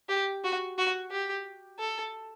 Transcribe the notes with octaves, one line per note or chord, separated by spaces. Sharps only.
G4
F#4
F#4
G4
A4